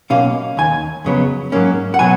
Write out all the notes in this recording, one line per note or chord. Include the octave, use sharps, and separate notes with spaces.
B1 B2 A#3 C#4 F5
D#2 D#3 G#5
F2 C#3 F#3 B3
G#2 F#3 A#3 C#4
F#5
B2 F#3 B3 G#5